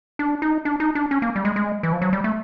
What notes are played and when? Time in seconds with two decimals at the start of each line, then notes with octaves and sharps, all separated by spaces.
0.19 D4
0.42 D#4
0.65 D4
0.80 D#4
0.95 D4
1.11 C#4
1.22 A#3
1.36 G3
1.45 G#3
1.56 G#3
1.83 E3
1.92 F3
2.02 F#3
2.13 G3
2.24 A3